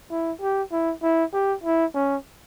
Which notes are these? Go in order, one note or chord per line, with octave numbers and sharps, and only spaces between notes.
E4
G4
E4
E4
G4
E4
C#4